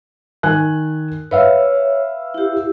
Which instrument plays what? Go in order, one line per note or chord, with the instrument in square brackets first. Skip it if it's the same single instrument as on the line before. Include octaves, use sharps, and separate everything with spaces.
[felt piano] D#3 G#5 F#6
[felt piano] B4 E5 F5 [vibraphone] C#5
[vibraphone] E4 G4